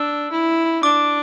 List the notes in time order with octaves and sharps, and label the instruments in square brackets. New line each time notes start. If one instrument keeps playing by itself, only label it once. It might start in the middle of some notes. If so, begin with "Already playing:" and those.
Already playing: [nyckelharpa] D4 [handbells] E6
[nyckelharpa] E4
[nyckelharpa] D4 [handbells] D6